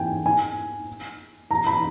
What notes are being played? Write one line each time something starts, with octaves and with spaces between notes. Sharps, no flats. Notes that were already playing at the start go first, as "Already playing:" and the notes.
Already playing: G5 G#5
G#5
A#5
B5